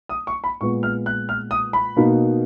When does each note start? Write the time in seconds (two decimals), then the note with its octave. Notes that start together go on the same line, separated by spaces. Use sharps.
0.09 D#6
0.27 C#6
0.44 B5
0.61 A#2 G#3 B3 C#6
0.83 F6
1.06 F#6
1.29 F6
1.51 D#6
1.73 B5
1.96 B2 A#3 D#4